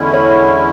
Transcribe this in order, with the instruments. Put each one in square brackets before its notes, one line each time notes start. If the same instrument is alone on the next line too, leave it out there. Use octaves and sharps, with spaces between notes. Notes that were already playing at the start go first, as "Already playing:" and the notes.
Already playing: [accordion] E2 D3 G#3 C#4 E4
[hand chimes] C#5